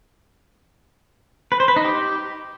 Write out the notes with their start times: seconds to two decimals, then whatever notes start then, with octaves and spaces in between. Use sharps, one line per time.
1.52 B4
1.60 C5
1.68 B4
1.76 D#4
1.85 G4